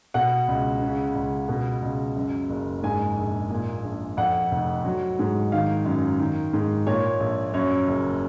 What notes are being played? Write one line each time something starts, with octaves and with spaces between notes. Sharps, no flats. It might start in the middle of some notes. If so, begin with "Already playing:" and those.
B2 F#5
C#2
C#3
C#2
B2
C#2
F#2
F#1
G#2 G#5
A#1
A#2
A#1
F2 F#5
F1
F#3
G#2
D#3 F5
F#2
D#3
G#2
A#2 C#5
A#1
F#2 C#5
F#1